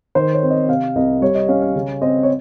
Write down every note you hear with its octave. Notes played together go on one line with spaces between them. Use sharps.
D#3 C5
C#5
C4
D#5
C3 F5
C2 D#5
G3 C#5
D#5
C#4 F5
F5
C#3
C4 D#5
C#5